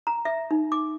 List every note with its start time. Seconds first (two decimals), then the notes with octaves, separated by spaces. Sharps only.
0.07 A#5
0.25 E5
0.51 D#4
0.72 D6